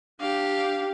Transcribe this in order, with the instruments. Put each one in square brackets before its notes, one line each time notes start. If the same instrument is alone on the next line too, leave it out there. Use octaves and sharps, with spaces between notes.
[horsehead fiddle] D4 [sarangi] G4 [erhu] F5